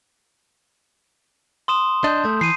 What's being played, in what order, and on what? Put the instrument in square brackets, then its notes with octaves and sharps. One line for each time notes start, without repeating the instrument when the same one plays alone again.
[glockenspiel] C6 D#6 E7
[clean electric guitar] D4 D#5 [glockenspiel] A5 G6
[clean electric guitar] A3
[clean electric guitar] E3 [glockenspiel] C7 D#7